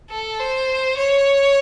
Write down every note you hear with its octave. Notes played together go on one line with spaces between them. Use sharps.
A4
C5
C#5